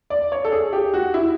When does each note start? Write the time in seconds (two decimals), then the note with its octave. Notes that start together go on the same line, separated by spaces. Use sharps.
0.10 D5
0.32 C#5
0.45 A4
0.52 G#4
0.73 G4
0.94 F#4
1.14 E4